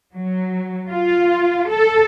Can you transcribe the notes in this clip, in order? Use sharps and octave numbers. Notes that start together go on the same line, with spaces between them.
F#3
F4
A4